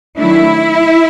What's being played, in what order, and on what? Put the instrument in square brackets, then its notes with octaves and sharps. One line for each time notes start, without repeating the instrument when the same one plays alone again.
[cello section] D#3 F#3 A3 D4 E4